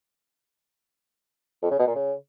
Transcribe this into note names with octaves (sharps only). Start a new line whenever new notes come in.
F2
C#3
B2
A#2
C#3